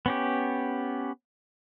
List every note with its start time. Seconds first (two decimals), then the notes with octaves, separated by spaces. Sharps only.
0.06 B3 C#4 G4